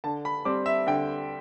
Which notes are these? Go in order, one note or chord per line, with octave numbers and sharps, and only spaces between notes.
D3 A5
B5
G3 C4 D6
E5
D3 G5